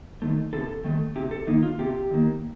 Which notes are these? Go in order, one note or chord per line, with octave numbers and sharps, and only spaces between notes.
D#3 A3
C3 A4
D#3 A3
C3 G4
A4
D#3 A#3 D#4
F4
C3 G4
D#3 A#3